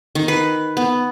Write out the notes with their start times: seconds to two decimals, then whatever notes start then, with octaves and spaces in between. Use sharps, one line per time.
0.15 D#3
0.28 B4
0.77 B3